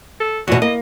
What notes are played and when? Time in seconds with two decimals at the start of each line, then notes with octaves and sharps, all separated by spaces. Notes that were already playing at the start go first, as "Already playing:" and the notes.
0.20 A4
0.48 E2 B2 F#4
0.62 A#3 D#5